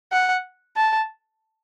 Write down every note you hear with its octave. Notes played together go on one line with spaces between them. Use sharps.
F#5
A5